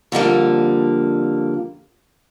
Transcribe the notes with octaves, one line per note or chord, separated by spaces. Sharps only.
F2 D3 G3 A#3